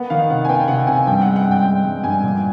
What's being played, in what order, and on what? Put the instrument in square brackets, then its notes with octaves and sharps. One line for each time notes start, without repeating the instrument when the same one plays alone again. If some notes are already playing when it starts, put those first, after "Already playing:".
Already playing: [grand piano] A#3 B3 [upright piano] F#5
[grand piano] D#3 [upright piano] F5
[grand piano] C3 [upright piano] F#5
[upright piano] G#5
[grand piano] B3 [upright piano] G5
[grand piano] C3 [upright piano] F#5
[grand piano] C3 [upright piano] G#5
[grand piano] G2 [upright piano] G5
[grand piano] G#3 [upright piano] F#5
[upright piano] F#5
[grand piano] G2
[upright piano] G5
[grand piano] G#3 [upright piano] G5
[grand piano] G2
[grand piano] G2 [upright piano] G#5
[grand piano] A#2